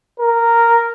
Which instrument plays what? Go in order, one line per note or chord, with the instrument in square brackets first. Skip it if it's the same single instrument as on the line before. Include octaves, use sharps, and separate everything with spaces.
[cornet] A#4